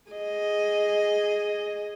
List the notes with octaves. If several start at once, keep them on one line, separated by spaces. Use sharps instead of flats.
G#4 D#5